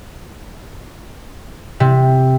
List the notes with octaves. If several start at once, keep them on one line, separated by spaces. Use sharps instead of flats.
C3